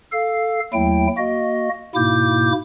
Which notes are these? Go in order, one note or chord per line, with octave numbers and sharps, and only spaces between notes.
A4 F5
D#2 F#3 A3 E4 G5
A#3 F#4 D#5
G#2 B2 A#3 E4 D6 G6